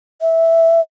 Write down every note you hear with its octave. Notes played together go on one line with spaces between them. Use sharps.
E5